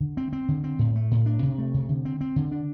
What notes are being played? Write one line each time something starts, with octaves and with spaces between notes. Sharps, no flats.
D3
C4
C4
D3
C4
A2
A3
A2
D4
C3
A3
C3
D3
C4
C4
D3
D4